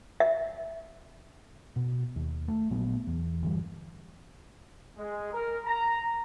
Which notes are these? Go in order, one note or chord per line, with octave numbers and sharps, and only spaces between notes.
E5
B2
D#2
A3
A#1 A#2 F#3 B3
E2
G1 E3 G3
G#3
A#4
A#5